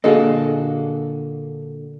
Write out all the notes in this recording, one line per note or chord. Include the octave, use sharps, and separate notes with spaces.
A#2 D3 A#3 F#4 G#4 A4 D#5 F5